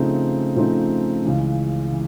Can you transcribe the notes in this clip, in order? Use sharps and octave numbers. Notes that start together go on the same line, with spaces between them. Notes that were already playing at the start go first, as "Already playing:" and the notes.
Already playing: C#3 F3 A3 C4 D#4
C#3 F3 A3 C4 D#4
C#2 C#3 E3
E3